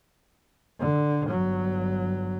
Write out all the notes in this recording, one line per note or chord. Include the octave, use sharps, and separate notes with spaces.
D3
G1 F#3